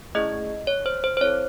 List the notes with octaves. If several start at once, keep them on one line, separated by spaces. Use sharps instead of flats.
A3 C#4 E4 G#4 D#5
C#5
C5
C5
C5
C4 E4 A4 C#5